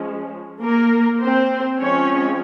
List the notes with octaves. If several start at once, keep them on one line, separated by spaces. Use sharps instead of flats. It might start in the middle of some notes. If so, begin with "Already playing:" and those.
Already playing: F3 G#3 C#4
A#3 A#4
C4 C5
F3 G#3 C4 C#4 C#5